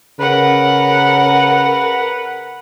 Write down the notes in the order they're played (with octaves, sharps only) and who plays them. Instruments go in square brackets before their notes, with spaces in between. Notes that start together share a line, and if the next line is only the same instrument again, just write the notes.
[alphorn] C#3 [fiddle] A#4 F#5 [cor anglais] B4